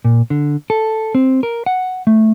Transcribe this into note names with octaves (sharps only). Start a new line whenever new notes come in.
A#2
D3
A4
C4
A#4
F#5
A3